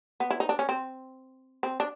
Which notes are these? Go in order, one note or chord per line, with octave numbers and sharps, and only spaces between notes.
B3
E4
D#4
D4
C#4
C4
C4
D4